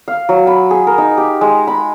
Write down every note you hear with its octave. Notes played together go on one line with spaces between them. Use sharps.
F5
F#3
B5
G#4
A#4
D#4
G4
G#3
B5